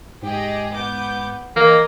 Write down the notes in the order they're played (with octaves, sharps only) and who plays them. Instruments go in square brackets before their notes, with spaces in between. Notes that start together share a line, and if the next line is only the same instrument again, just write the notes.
[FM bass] G#2 [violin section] G4 G#4 D#5
[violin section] B3 D6 G6
[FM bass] E3 [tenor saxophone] A#3 [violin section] G#4 A#4 D#5